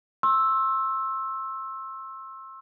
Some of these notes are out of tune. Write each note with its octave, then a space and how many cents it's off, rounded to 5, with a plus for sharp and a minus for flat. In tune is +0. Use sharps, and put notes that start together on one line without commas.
C6 +35 E6 +0